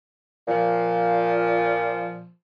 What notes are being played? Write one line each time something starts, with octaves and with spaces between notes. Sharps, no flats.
A#2 F3